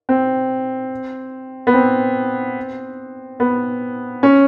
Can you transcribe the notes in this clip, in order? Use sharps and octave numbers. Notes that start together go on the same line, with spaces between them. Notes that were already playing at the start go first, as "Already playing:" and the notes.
C4
B3
C4
B3
C#4